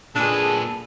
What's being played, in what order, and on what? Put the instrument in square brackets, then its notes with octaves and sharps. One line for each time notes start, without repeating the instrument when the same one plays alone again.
[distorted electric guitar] A#2 B4 [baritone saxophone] D4 [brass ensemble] G#4 [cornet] A4